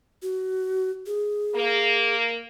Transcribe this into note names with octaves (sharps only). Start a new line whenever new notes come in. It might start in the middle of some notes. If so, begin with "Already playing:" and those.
F#4
G#4
A#3